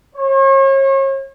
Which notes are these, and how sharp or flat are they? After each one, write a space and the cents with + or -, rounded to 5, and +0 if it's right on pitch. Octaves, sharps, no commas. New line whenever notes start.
C#5 -40